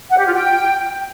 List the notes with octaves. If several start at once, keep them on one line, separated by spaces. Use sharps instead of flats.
F#5
G4
F4
G5